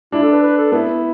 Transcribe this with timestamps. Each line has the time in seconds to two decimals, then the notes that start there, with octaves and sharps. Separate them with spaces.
0.12 D4 E4
0.23 A4
0.32 B4
0.43 B4
0.58 A4
0.72 B3 E4